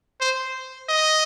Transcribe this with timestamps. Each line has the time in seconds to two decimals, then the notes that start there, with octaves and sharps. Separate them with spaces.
0.20 C5
0.89 D#5